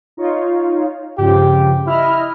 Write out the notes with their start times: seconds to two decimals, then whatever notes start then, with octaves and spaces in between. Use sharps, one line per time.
0.17 D#4 F4 C#5
1.18 G2 C#3 F3 G4
1.87 E4 D#5 F6